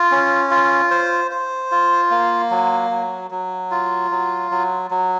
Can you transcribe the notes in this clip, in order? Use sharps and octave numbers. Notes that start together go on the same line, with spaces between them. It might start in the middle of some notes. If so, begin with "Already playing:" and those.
Already playing: F4
C#4
F4
C5
C5
F4
A#3
F#3
F#3
F#3
F4
F#3
F#3
F#3